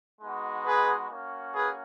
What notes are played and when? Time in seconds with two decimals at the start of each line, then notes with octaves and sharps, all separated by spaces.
0.21 G#3 B3 D#4 F#4
0.66 G#4 B4
1.10 A#3 C#4 F#4
1.55 G#4 B4